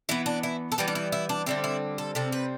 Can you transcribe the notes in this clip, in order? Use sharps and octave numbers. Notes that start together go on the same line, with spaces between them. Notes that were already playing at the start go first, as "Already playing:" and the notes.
E3 B3 E4
D4
E4
A4
E3 G3 B3 G4
D4
E4
E4
D4
D3 G3 C4 E4
E4
A4
C3 G3 C4 A4
B4